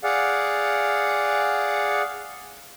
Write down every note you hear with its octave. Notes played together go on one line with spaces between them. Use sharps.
G#4 D5 F5 F#5